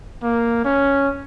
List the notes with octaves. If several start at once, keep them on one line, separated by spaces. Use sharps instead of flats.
A#3
C#4